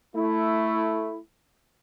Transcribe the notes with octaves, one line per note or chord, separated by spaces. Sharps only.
A3 E4